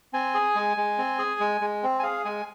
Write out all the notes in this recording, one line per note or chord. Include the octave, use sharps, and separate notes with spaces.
C4 G#5
G#4
G#3
G#3
C4
G#4
G#3
G#3
C4
G#5
G#4 F5
G#3 G#5